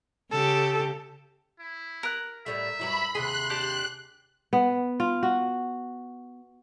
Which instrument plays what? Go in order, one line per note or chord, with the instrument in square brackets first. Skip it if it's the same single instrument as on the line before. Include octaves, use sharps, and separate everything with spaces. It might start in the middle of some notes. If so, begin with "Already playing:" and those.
[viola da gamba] C#3 G4 [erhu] A4
[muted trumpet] E4
[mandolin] A#4 F#6
[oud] A2 G3 A3 [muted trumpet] E5
[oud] G2 F#3 E4 [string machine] B5
[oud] D#2 C3 G#4 [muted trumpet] C6 [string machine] F#6
[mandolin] D4 G4
[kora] B3
F4
F#4